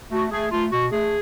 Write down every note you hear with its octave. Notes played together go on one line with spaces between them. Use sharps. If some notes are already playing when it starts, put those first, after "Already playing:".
A3 F#4
A3 G#4
A3 F4
B2 F#4
A3 G#4